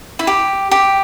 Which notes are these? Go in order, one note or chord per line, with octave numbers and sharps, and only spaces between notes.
E4
G4
G4